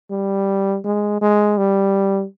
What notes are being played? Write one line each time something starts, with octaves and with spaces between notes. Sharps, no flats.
G3
G#3
G#3
G3